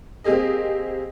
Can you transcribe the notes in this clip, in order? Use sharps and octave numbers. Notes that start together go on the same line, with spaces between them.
A#3 C4 G4 G#4 D#5